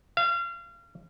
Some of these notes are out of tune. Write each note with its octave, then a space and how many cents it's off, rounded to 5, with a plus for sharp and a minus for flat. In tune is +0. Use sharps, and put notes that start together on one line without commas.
F5 -30